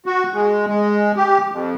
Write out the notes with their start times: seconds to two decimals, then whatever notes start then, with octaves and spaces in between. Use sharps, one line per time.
0.06 F#4
0.34 G#3
0.67 G#3
1.16 G4
1.52 F2